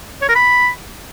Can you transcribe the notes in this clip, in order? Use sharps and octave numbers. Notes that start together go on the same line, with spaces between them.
C#5
A#4
B5